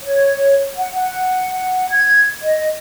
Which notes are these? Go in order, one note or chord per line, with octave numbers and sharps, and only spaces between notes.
C#5
F#5
F#5
G#6
D#5